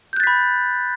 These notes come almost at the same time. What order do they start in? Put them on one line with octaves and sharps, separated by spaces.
G6 F#6 A6 B6 B5